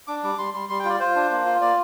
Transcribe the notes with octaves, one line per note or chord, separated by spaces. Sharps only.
D4 D6
G3 D6
G3 C6
G3 C6
G3 C6
G5
F4
D5
F4 C5
D4
A#3
F4
A#3 D5